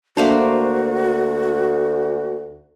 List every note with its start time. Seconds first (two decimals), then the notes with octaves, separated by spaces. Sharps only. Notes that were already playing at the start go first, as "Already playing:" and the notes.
0.17 D2 A3 A#3 D4 F#4 C5